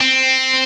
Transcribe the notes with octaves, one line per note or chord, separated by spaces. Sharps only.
C4